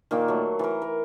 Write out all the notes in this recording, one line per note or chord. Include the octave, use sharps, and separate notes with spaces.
A#2 D#3 A#3 C5
F#3 A3
E3 A#4
A#4